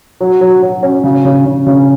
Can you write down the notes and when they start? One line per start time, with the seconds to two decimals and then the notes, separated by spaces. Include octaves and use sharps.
0.20 F#3
0.41 F#3
0.62 F#3
0.83 C#4
1.04 C#3
1.25 C#3
1.45 C#3
1.66 C#3